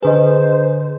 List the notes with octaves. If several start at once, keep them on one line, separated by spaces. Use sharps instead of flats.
D3 G#4 B4 C5 D#5